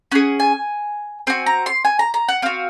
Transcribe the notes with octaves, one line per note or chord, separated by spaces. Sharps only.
C#4 G#4 F#5
G#5
C4 F#4 G#5
A#5
C6
G#5
A#5
A#5
F#5
C4 F#4 F5